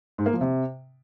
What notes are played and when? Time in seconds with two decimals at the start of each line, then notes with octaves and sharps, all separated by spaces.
0.18 G#2
0.26 A#3
0.33 F3
0.41 C3